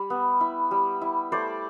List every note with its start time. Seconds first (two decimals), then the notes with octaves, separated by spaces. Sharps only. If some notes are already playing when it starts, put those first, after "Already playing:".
Already playing: G3
0.10 B3
0.41 E4
0.71 G3
1.02 E4
1.32 A3 C5 D5